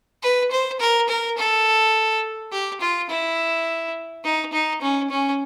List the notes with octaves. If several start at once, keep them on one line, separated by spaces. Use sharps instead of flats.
B4
C5
A#4
A#4
A4
G4
F4
E4
D#4
D#4
C#4
C#4